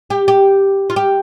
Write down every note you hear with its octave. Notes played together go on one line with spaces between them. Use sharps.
G4
G4
F4
G4